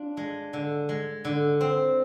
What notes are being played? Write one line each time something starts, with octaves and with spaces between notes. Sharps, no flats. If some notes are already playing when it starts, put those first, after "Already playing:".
Already playing: D4 F4
G#3
D3
G#3
D3
C4